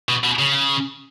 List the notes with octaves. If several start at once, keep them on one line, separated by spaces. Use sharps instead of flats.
B2
B2
C#3